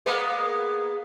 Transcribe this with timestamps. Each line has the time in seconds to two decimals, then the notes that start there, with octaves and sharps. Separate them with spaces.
0.06 G#3 A#3 B3